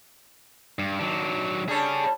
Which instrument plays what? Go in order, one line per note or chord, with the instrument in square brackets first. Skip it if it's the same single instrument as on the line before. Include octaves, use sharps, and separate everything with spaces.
[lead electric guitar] G2
[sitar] D#3 [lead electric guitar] F#3 D4
[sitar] G3 D4 A4 [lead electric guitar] G#4 C#5